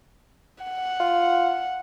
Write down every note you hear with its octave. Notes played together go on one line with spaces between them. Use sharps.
F#5
F4